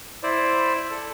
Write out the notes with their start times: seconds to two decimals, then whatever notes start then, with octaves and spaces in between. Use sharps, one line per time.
0.23 E4 C5 D5
0.91 A4